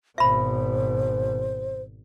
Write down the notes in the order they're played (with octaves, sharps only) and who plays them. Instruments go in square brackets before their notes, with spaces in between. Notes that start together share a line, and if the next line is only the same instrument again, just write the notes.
[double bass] G#1 B2 [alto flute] C5 [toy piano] E5 B5